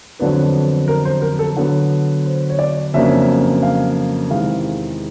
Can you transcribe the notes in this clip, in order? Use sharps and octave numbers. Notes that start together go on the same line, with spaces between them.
F2 D3 F#3 B3 D4 B4
A#4
C5
A#4
A4
D3 F#3 B3
C5
C#5
D5
F2 C#3 F#3 A#3 D4 E5
F5
E2 C3 D#3 G#3 F5